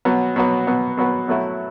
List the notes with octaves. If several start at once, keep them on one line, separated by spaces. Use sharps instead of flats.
B2 F#3 B3
B2 F#3 B3
B2 F#3 B3
B2 F#3 B3
B2 F#3 A3 E4